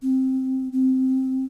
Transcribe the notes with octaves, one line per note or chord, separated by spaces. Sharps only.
C4
C4